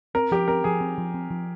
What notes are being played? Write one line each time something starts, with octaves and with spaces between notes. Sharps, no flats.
C4 A#4
F3 G4
C4 A#4
F3 G#4
C4
F3
C4
F3